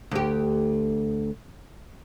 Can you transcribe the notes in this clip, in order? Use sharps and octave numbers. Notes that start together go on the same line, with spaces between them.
D2 G4